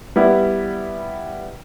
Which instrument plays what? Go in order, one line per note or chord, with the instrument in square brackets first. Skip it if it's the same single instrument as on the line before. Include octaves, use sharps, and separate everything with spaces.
[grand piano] G3 B3 E4